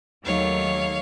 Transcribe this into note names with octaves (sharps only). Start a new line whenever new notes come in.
D#2 D#3 F#3 A3 C#5 F5